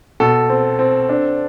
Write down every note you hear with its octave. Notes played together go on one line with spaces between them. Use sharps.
B2 A4
C4
C4
D4